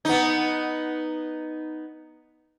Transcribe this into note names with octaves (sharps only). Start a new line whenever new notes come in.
B3 D#4